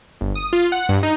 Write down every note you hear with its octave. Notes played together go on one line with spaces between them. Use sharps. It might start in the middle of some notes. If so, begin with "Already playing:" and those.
G1
D#6
F4
F#5
G2
D#4